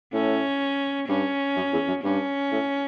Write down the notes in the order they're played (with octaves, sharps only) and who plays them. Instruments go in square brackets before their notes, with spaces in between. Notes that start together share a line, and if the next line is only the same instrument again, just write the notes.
[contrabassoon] A2 [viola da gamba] C#4
[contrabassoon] G2 [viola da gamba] C#4
[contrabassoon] F#2
E2
F#2
[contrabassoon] G2 [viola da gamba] C#4
[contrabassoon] A2